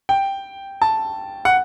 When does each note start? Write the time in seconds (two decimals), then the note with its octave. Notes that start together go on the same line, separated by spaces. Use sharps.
0.09 G5
0.82 A5
1.45 F#5